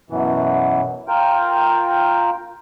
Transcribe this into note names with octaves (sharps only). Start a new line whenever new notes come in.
F#2 B2 E3
F4 A#4 G5